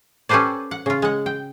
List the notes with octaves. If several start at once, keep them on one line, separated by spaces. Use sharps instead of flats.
C#4 G4 A4 B4 C5 D5
F#5
C#3 F4
G#3 F#5
G5